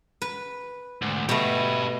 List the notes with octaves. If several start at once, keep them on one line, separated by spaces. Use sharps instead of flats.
B4
D2 G#2
B2 A3 G4 B4